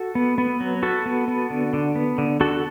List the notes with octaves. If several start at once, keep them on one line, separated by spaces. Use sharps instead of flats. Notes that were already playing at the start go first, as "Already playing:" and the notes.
Already playing: F#4 A4
B3
B3
F#3
B3 F#4 A4
B3
B3
D3
D3
B3
D3
D3 F#4 A4